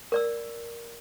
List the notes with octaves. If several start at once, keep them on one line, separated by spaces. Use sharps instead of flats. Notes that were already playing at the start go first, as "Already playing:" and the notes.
A#4 D5 E6